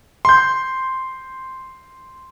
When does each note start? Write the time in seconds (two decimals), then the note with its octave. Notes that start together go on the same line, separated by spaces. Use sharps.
0.25 C6 G6